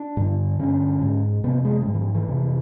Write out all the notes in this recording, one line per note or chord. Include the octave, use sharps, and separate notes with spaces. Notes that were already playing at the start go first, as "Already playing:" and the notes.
Already playing: D4
G2 D3
G2 D3 C#4
G#2
F2 C3 B3
G#3
F#3
G#2 G3
E3
F3
E3
F2 C3